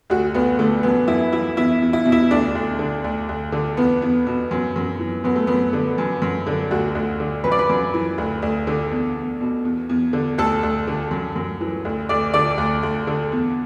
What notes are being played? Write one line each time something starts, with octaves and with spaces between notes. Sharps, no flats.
D2 F#4
D2 B3
D3 A3
F#2 B3
F#2 E4
E3 E4
E2 E4
E2
E4
B2
E4
D2 D4
D2
D3
D2
D2
D3
E2 B3
E2
B2
F#2
F#2
E3
F#2 B3
A3
F#2 B3
D3
F#2
F#2
D3
D2 F#4
D2
D3
F#2 B4
D5
B4
F#2
E3
D2
D2
D3
E2
E2
B2
E2
E2
D3
D2 A4
D2
D3
F#2
F#2
E3
D2
D2 D5
D3 D5
D2
D2
D3
E2